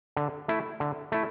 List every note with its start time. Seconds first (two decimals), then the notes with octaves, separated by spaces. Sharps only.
0.17 D3
0.48 A3 E4
0.80 D3
1.12 A3 E4